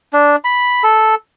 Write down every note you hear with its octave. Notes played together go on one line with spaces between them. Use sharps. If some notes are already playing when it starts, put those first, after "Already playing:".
D4
B5
A4